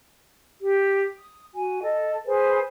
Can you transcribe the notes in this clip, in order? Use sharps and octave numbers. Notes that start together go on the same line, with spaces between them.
G4
D#6
F#4 G#5
A4 D#5
G#4 B4 C5 G#5